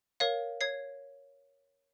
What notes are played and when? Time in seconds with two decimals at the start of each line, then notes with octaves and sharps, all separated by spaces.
0.20 A#4 C#5 F5
0.61 C#5 G#6 C7